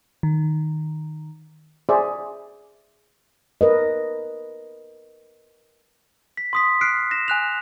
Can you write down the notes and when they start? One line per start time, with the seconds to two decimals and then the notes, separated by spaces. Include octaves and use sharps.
0.23 D#3
1.89 G#4 C5 D5 E5
3.61 A#4 B4 D#5
6.37 B6
6.53 C6 D#6 B6
6.81 F6 F#6 C7 D7
7.11 A#6 E7
7.28 G#5 F#6 F7